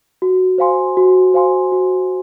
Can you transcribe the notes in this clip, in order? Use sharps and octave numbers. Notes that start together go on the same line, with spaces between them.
F#4
C5 F5 G#5 C6
F#4
C5 F5 G#5 C6
F#4